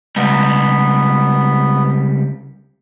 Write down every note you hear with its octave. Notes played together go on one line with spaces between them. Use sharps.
C#2 G3 B3